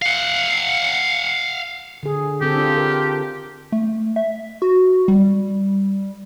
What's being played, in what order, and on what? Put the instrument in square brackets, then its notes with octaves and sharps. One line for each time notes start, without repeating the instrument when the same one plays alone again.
[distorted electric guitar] F5 F#5
[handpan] D3 G#4
[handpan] D3 C4 A4 [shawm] G4
[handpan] D4 F4
A#4
[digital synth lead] A3
E5
F#4
G3